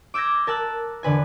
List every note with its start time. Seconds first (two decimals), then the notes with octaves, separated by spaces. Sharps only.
0.14 D6 E6 G6 G#6 A#6
0.47 A#4 A5 E6 F#6 A6
1.03 E1 D3 B4 G#5